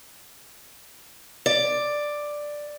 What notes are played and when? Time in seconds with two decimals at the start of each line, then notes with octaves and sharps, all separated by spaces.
1.46 D5